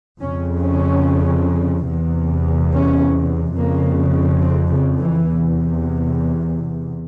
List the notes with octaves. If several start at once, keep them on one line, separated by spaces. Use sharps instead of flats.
F2 C#3 C#4
C#4
E2 C3
C#4
F2 C#3 A#3
C4
C#3
E3
E2 C3